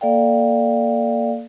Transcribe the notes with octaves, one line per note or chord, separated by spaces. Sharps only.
A#3 A4 D5 F5 G5